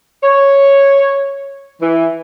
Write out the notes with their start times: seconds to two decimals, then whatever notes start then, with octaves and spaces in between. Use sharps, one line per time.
0.23 C#5
1.81 E3